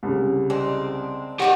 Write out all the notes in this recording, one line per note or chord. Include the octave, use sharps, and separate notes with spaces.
C2 C#3
G#3 C4 D4
A#2 D#4 G4 F#5 G5